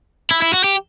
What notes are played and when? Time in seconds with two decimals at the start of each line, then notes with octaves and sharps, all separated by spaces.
0.31 E4
0.42 E4
0.54 F#4
0.64 G4